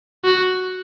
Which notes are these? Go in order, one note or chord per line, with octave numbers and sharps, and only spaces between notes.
F#4